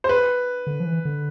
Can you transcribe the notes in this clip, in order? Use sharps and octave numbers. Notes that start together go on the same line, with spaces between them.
C5
B4
D3
F3
E3
D3